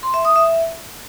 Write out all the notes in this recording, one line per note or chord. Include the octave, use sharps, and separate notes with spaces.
C6
E5
D#6
E5